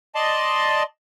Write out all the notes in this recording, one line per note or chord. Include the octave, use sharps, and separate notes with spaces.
D5 D#5 A5 C6